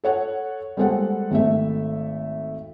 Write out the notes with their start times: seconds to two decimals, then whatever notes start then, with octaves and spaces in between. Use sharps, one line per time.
0.04 A4 C#5 F#5
0.77 G3 G#3 A#3 A4 C5 F#5
1.31 G#1 A3 E5